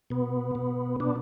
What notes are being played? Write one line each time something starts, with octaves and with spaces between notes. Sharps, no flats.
B2 B3
B2
B2 B3 D4